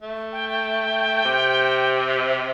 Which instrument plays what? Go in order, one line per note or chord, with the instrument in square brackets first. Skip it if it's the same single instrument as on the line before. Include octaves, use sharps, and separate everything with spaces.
[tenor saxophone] A3
[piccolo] G5
G5
[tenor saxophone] C3